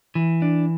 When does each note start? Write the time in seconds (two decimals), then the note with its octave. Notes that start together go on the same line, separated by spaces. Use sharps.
0.15 E3
0.42 D4